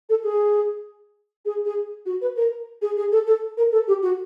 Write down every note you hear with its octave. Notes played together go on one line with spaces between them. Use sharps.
A4
G#4
G#4
G#4
F#4
B4
A#4
G#4
G#4
A4
A4
A#4
A4
G4
F#4